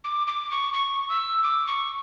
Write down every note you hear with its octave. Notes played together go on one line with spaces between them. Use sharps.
D6
D6
C#6
C#6
E6
D6
C#6